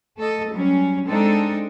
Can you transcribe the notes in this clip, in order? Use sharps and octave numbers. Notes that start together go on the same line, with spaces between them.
A3 A4 D#5
F#3 G3 C#4
G#3 C4 D4 D#4 A4